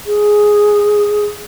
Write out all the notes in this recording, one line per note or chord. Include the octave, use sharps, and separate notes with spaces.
G#4